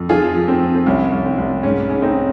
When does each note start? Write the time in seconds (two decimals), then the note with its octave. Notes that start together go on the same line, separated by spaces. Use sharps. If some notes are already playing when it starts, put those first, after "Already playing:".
Already playing: F2
0.09 F3 F4 G#4
0.36 F3
0.48 C4
0.61 F3
0.75 C4
0.86 C2 C#4
1.12 C2
1.25 C4
1.38 C2
1.63 G#2 C#4
1.89 G#2 C#4
2.02 C4 D#4